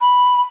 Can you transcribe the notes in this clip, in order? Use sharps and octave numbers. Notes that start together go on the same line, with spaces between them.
B5